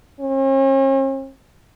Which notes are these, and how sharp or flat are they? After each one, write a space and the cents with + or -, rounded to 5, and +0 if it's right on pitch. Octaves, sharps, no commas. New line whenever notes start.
C#4 -45